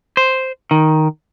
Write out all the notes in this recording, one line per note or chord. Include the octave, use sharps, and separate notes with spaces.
C5
D#3